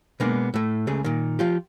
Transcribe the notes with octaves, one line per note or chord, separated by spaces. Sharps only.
B2 G#3 A#3 B3 D4
A2 A3
C#2 C#3 A3 G#4
A#2 D#3
F3 F4 G4